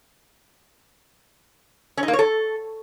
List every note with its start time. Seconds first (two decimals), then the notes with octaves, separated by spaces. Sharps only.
1.97 C#4
2.03 D#4
2.08 A#3
2.13 C#5
2.19 A4